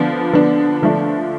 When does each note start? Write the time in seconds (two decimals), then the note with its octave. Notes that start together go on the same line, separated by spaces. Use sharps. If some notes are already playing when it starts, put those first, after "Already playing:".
Already playing: D3 F3 B3 D4
0.33 D3 F3 B3 D4
0.82 D3 F3 A3 D4